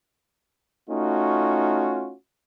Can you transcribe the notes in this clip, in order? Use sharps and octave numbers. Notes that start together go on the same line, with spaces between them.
A3 C#4 D#4 F4 F#4